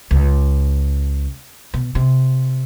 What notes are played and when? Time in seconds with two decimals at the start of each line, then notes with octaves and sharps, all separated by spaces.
0.11 C#2
1.74 B2
1.95 C3